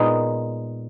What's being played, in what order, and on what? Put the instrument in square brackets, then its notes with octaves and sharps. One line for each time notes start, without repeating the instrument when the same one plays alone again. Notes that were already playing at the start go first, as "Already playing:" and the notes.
Already playing: [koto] A#2 G#3 B3 D#4